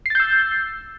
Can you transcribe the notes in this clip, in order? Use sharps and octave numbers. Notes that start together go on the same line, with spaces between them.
E6 G6 A6 C7